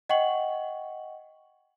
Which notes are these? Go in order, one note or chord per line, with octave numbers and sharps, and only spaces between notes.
D#5 F#5 G5 C#6 F#7